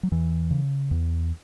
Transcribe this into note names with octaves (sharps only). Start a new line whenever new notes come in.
F#3
E2 E3
C#3
E2